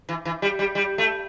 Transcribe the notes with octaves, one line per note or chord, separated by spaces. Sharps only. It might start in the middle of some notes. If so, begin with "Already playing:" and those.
E3
E3
G3
G3
G3
A3